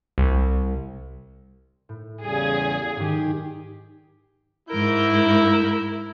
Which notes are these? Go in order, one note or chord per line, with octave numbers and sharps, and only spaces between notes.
C2
A2
E2 C#3 G3 G#4
G#2 D#3 G4
G#2 E4 A#4 G6